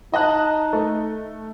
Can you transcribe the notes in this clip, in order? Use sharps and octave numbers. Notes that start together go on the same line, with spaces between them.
D#4 D#5 A5 F#6
A3